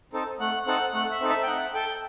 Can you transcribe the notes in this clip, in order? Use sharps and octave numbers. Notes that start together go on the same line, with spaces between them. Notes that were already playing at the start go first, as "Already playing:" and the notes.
C4 D#4 A4
A3 F#5
C4 D#4 A4 F#5
A3 F#5
E5
C4 D#4 A4
E5
G5
D#4 F#5
A4 G5